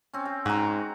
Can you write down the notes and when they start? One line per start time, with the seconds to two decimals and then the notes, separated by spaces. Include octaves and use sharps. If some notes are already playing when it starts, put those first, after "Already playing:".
0.13 C4 C#4
0.25 G5
0.46 G#2 F#4 A#5